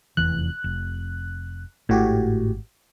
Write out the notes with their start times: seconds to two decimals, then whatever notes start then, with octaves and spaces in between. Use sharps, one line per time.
0.17 F1 E2 E3 F#6
0.64 F1
1.89 G#1 A2 F#4 G4